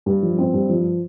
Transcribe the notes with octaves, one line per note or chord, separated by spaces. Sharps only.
G2
F3
C4
G2
F3